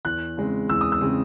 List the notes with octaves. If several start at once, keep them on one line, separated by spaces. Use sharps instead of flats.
E2 F#6
C#3 G#3 C4
E2 E6
D#6
E6
C#3 G#3 C4